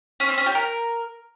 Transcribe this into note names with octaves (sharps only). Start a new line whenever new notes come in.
C#4
C4
C#4
G4
A#4